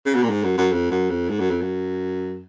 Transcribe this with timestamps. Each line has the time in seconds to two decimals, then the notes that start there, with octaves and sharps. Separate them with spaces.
0.06 C#3
0.15 B2
0.23 A#2
0.29 G#2
0.43 F#2
0.57 F#2
0.72 F2
0.91 F#2
1.10 F2
1.29 G#2
1.39 F#2
1.50 F2
1.62 F#2